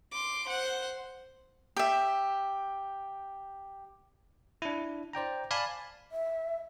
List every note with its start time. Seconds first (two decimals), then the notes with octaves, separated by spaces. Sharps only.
0.11 C6 D6
0.47 C5 F#5
1.77 G4 E5
4.62 D4 E4
5.13 C5 D5 G5 A#5
5.51 D5 F5 G#5 A5 B5
6.11 E5